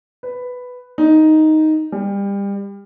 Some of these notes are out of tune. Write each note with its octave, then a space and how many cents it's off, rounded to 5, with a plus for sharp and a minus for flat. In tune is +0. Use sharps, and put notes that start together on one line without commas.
B4 +5
D#4 +5
G3 +30